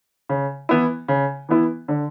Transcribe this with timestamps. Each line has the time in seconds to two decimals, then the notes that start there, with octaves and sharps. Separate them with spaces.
0.29 C#3
0.69 E3 B3 E4
1.08 C#3
1.49 E3 B3 E4
1.88 D3